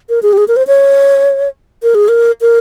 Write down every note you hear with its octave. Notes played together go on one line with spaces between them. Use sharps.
A#4
G#4
G4
G#4
A#4
C5
C#5
A#4
G#4
A#4
A#4